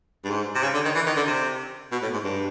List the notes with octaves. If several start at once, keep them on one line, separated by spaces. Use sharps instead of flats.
G2
G#2
C3
C#3
D3
D#3
E3
D#3
D3
C3
B2
A2
G#2
G2